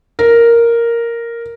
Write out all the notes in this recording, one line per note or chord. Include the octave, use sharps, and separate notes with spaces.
A#4